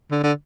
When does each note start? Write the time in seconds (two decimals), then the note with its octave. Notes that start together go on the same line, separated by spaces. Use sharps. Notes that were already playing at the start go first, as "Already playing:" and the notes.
0.11 D3
0.24 D3